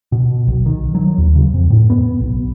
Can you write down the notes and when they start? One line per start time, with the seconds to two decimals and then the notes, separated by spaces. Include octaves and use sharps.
0.12 B2
0.48 B1
0.66 D#3
0.95 F#3
1.18 D#2
1.35 C#3
1.54 F2
1.70 A2
1.90 B3
2.21 B1